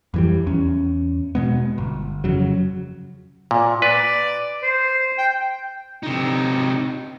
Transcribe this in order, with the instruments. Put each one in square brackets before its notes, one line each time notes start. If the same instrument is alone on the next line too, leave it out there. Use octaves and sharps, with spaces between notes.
[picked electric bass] F2 E3 G3
E2 C#4
B2 G#3 B3
G1
F2 C#3 F#3
[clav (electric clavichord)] A#2
[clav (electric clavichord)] B4 [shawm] D5
[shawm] C5
G5
[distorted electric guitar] C3 D#4